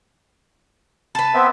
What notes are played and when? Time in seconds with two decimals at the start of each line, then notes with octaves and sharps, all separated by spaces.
1.15 B4 A5
1.34 B3 C4 E5